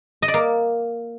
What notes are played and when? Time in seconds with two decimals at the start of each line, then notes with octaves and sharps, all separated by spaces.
0.22 D#5
0.28 D5
0.34 A#3